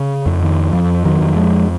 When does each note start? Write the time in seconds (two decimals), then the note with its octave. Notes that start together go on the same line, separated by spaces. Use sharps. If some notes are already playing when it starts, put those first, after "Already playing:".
Already playing: C#3
0.26 F2
0.42 D#3
0.73 F2 F3
1.05 D#3 F#3
1.21 F2
1.36 F3 G#3